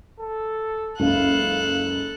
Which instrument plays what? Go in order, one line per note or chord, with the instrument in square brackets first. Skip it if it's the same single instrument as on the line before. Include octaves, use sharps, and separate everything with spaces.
[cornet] A4
[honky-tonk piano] F#1 C#2 [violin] A4 F#6 [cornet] F5